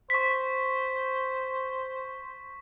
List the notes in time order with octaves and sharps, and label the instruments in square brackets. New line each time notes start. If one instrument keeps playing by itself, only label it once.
[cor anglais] C5 [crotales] C#6 B6